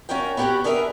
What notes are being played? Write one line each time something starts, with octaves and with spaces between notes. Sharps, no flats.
C#4 F4 F#4 A#4 G5
B3 F#4 G4 A#4 C#5 F#5
B3 D4 G#4 A#4 E5